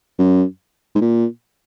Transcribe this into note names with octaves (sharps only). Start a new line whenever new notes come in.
F#2
G#2
A#2